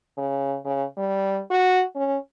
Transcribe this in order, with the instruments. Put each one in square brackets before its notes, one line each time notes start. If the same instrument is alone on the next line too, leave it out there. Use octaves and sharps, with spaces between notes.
[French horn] C#3
C#3
G3
F#4
C#4